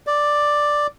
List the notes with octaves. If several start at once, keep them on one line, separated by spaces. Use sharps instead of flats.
D5